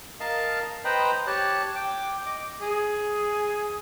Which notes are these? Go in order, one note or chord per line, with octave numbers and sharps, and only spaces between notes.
A#4 D#5 F5 A5
B4 C5 D#5 G5 A#5 B5
G4 C#5 A5 F#6
G5 D6
D#5 D6
G#4